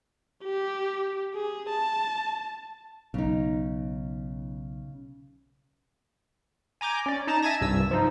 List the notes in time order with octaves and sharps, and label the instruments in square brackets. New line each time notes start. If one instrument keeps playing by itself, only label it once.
[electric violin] G4
G#4
A5
[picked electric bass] B1 [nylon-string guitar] C#3 D#4
[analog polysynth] G#5 A#5 D6 G6
C#4 D5
D#4 A5 A#5
E5 G#5 A5 G#6 A#6
C2 G2 E6
F3 D#4